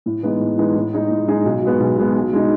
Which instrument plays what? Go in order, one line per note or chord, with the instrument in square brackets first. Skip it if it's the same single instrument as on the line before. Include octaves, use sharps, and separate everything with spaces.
[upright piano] A2
E3 G#3 B3 D#4
A2
E3 G#3 B3 D#4
A2
G#3 D#4 G#4
A2
G#3 D#4 G#4
B1
B2 G#3 B3
B1
B2 G#3 B3
B2
G#3 D#4